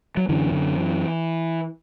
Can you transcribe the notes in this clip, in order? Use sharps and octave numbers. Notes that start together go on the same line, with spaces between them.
F#3
F#2 D3 E3
D3
E3